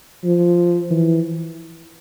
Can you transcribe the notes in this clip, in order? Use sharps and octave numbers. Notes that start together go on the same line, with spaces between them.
F3
E3